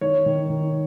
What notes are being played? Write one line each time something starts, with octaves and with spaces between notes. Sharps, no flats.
D#3 C#5
D#3
D#3